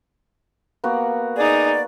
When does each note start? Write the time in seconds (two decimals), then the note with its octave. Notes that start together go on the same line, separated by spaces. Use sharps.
0.84 A#3 B3 F#4
1.37 D#4 G#4 D5